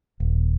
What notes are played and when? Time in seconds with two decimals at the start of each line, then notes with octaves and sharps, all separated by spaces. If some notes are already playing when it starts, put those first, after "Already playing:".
0.20 D#1